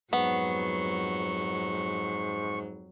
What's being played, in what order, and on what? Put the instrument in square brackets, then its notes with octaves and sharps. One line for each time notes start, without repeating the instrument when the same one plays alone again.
[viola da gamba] F2 F#3 [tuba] G#2 [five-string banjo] B3 [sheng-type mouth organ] C#6